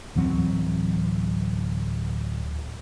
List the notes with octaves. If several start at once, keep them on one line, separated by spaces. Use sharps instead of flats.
D1 E3 F#3 C4